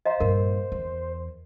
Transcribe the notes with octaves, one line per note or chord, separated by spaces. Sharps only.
C5 D#5 F5 A#5
G2 A#2 A#4
E2